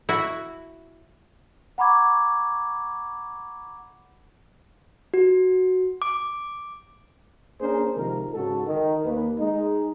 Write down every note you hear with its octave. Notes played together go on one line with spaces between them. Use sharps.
E4 F#4
F#5 A#5 B5 C#6 D6 G#6
F#4
D6
A#3 C#4 D4 G#4 A#4 C5
C3 D#3 F3 G#3 A#4
G#2 C#3 F#4 A4
D#3
D#2 A#3 D#4 B4
G#3 D#4